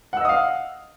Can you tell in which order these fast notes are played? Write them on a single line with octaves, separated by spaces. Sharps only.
F#5 E6 D#5 D#6 F5